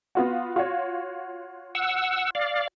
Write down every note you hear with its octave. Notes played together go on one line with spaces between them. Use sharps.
B3 F4 F#4
F4 F#4 C#5
F#5 E6
D5 F5